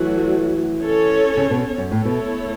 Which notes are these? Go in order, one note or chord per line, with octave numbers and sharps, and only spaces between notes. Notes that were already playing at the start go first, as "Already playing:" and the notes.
Already playing: E3 F#3 A3 F#4
C#4 A4 C#5
C#3
B2
F#2
A2 A3 E4 A4 C#5
B2